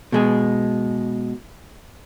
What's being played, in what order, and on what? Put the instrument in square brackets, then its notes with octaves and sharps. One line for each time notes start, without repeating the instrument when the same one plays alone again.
[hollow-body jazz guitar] B2 G#3 G#4